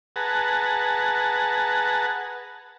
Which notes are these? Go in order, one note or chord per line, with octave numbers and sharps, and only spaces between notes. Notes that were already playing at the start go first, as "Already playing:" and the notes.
G#4 B4 F#5 A5 A#5